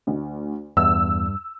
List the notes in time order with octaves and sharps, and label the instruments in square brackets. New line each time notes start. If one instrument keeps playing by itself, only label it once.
[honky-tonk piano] D2
[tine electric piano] E2 [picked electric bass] G2 [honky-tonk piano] E6